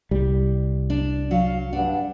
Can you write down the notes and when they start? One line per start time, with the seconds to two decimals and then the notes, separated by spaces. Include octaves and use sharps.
0.11 C2 G3
0.90 D4
1.31 F#3 F5
1.73 G2 D4 F#5